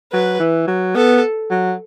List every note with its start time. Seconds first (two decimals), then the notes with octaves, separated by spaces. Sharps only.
0.13 F#3 B4
0.40 E3
0.67 F#3
0.95 B3 A4
1.50 F#3